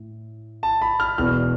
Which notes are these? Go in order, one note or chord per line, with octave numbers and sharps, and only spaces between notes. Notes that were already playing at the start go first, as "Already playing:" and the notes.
Already playing: A2
A5
B5
F6
E1 E2 B2 F6